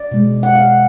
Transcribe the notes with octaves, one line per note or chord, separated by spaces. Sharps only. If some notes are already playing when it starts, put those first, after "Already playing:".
Already playing: D5
B2 G#3
F#5
F5